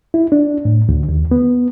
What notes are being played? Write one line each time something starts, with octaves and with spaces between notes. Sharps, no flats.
E4
D4
A2
D2
D#2
B3